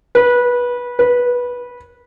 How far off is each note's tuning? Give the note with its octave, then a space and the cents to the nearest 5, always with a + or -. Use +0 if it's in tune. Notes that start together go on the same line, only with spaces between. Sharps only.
B4 -20
B4 -15